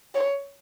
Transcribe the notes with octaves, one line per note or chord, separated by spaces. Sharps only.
C#5